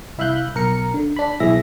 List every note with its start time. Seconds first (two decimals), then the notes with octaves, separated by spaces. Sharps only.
0.18 C2 E4 E5 F5 F#6 G6
0.55 B1 A#4 C#7
0.94 D3
1.16 D4 B5
1.40 B1 E3 G#4 E5 A#6